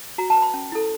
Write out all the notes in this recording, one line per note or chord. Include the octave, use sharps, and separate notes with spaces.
F#4 A#5
A5
B4
B5
C#4
E4 A4